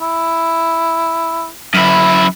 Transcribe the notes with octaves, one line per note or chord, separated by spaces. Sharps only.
E4
F#2 E4